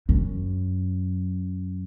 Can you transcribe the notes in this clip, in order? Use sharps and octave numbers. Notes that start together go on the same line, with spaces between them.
F#2